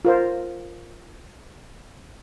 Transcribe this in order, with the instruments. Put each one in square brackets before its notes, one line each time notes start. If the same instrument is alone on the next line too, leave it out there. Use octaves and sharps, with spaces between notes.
[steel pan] F4 A#4 C5